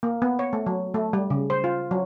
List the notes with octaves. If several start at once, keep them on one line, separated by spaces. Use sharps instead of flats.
A#3
B3
C#5
A3
F#3
A3
G3
C#3
C5
F4
F#3